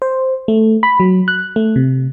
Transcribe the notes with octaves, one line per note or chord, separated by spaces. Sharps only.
C5
A3
B5
F#3
F#6
A3
C3